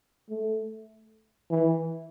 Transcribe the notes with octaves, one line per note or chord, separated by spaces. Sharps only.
A3
E3